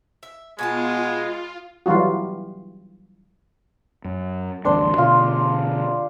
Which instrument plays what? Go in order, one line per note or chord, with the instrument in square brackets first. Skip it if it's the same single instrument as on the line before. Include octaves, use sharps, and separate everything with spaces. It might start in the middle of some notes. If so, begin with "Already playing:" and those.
[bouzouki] E5
[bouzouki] B2 B3 A5 [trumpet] G#3 [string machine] F4 [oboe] G#5
[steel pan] E3 F#3 G3 F4 F#4
[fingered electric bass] F#2
[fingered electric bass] A1 D2 G2 [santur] D4 C5
[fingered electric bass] B2 D3 [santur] F4